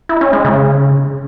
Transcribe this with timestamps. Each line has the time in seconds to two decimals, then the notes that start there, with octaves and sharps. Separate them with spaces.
0.09 E4
0.21 C#4
0.33 G#3
0.45 C#3